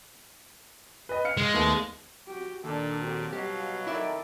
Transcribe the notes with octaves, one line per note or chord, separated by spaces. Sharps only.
B4 D#5
F5 F6 C#7
G#3
D#2 A3 B3
F#4 G4
D#2 A#2 D4 A4
F#3 C4 F#4 G4 A4
B2 F#3 G3 G4 F5
D#3 E4 A4 D5 E5